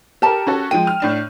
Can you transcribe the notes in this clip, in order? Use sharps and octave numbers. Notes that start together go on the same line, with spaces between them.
G4 A4 A#4 A5
C#4 F#4 A4
F3 G#3 G5 D#7
F6
A2 D4 E7